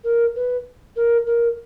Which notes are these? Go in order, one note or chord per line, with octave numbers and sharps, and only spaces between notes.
A#4
B4
A#4
A#4